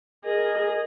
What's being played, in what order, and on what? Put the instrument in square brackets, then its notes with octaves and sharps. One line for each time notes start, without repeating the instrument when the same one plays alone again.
[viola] G#4 D#5 [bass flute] A#4